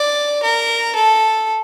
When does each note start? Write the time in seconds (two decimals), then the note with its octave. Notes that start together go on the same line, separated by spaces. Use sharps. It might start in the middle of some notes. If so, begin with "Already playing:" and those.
Already playing: D5
0.43 A#4
0.95 A4